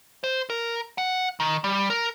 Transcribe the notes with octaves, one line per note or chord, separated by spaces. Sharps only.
C5
A#4
F#5
D#3
G3
A#4